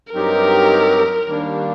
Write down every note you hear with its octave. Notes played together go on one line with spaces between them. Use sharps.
G2 F#3 C4 D#4 G4 A#4
D#2 D#3 G3 A#3 D4